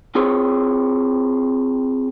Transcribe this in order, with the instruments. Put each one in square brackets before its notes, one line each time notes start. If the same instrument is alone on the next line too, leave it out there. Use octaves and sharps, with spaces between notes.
[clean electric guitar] C4 F4 G#4 C5 C#5